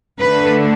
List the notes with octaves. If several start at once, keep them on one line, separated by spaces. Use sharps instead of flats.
D3 A3 D4 B4